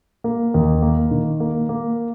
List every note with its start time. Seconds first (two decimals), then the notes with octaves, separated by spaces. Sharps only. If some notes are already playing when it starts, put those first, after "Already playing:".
0.24 A#3
0.54 D#2
0.82 A#3
1.11 D#3
1.40 A#3
1.69 A#3